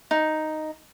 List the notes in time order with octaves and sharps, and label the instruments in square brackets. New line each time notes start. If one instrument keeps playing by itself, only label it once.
[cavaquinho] D#4